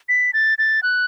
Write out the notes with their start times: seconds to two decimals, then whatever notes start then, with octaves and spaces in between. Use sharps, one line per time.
0.09 B6
0.33 A6
0.58 A6
0.83 F#6